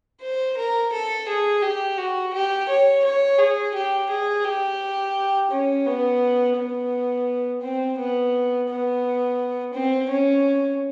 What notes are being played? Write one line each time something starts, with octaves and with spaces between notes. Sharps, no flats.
C5
A#4
A4
G#4
G4
F#4
G4
C#5
C#5
G#4
G4
G#4
G4
C#4
B3
B3
C4
B3
B3
C4
C#4